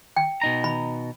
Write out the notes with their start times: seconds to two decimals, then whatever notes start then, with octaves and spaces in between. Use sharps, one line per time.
0.17 G5
0.42 B2 D#4 A#5
0.64 B5